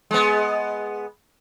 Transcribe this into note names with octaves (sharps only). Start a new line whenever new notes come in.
G#3 B3